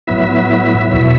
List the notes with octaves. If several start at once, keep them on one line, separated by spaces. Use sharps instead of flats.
A2 F#3 B3 E4 E5
E2 B2 F#3 E4 E5